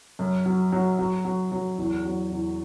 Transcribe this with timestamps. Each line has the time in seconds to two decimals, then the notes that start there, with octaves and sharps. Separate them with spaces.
0.19 F#2
0.46 F#3
0.72 F#3
0.99 F#3
1.25 F#3
1.52 F#3
1.78 E2
2.05 F#3
2.32 E2